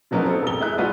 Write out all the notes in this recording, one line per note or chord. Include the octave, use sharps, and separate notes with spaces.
C#3 F3 F#3 A#3 B3 D#4
C4 A4
E1 G7
G#3 E4 F#6
G3 G#3 B3 F4 F#4 B4